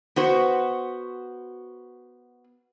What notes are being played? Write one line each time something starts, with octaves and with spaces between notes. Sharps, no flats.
B3 F#4 C5